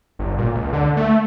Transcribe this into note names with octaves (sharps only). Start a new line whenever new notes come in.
G1
A#2
C#2
D3
A3